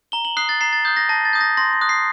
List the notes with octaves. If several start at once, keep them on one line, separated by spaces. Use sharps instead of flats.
A#5 G7
F#7
D#6 F#6 C7
A6
A#5 C7
A6
D#6 F#6 G6
A#6
A5 A#6
A6
D#6 G6
A#6
C6 A#6
A#6
D#6 F#6
C7